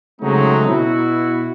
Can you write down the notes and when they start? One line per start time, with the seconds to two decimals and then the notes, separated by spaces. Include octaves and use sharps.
0.20 C#3 F#3 G#3 A3 C4 D#4
0.67 B2 E4 F#4